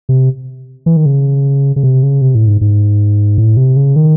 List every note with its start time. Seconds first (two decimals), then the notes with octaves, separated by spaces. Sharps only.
0.09 C3
0.86 E3
0.97 D#3
1.06 C#3
1.76 C#3
1.83 C3
2.03 C#3
2.21 C3
2.35 A2
2.48 G#2
2.61 G#2
3.38 A2
3.57 C3
3.76 C#3
3.96 D#3